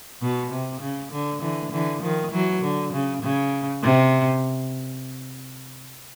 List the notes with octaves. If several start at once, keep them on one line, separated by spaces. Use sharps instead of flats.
B2
C3
C#3
D3
D3 E3
D3 E3
D#3 F3
E3 F#3
D3
C#3
C#3
C3